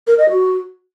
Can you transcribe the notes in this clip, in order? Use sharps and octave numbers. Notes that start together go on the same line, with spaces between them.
A#4
D#5
F#4